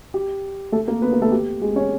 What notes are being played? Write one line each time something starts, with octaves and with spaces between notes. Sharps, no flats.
G4
A3 A4
A#3 A#4
B3 B4
A#3 A#4
A3 A4
G4
G#3 G#4
C#4 C#5